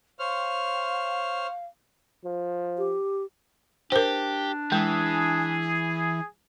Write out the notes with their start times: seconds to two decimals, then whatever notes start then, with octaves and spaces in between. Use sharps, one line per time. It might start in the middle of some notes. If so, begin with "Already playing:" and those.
0.19 C5 C#5 F5 F6
2.25 F3
2.78 G4
3.92 D4 G4 A#4 C5
4.72 E3 G#3 G#4